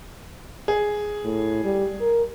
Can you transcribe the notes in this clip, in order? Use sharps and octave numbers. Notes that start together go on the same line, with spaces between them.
G#4
A2
G3
A#4